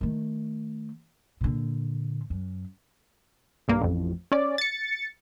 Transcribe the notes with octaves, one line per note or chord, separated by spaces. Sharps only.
D#3 A3
A#2 D3
F#2
B1 G2 A#3
A1 F2
C#4 C#5 D5
A6 C#7